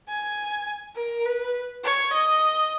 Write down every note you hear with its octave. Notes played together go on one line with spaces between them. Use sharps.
G#5
A#4
B4
C#5
D#5